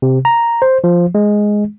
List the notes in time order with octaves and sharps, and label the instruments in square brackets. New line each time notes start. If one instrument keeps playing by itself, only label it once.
[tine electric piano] C3
A#5
C5
F3
G#3